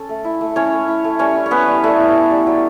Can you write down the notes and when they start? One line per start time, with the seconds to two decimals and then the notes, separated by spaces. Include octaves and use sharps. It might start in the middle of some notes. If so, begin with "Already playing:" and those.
Already playing: C#4 A4
0.09 A3
0.24 E4
0.41 A3
0.56 C#4 E4 C#5
0.72 A3
0.88 E4
1.04 A3
1.19 G3 C#4 C#5
1.36 E4
1.46 C#5
1.51 B3 C#4 B4
1.67 G3
1.83 G3 A3 A4
1.99 E4
2.15 C#4
2.31 G3
2.47 F#3